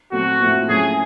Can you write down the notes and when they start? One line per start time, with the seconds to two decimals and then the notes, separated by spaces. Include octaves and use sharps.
0.12 A#2 F#3 A3 C4 F#4
0.40 A2 F3 A3 C4
0.69 A2 F#3 A3 C#4 G#4